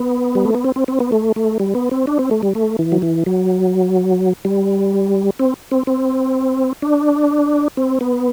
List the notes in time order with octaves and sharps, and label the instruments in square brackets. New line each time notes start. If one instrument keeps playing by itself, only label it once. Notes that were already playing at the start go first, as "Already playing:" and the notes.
Already playing: [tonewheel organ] B3
G3
A3
B3
C4
C4
C4
B3
A3
A3
G3
B3
C4
D4
C4
A3
G3
A3
E3
F#3
E3
F#3
G3
C4
C4
C4
D4
C4
B3